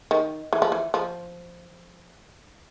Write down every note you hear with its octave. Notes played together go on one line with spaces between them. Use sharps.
D#3
E3
F3
E3
F3